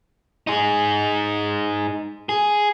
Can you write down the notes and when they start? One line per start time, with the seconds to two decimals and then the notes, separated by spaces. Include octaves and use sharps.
0.47 D#4 G#4
2.29 G#4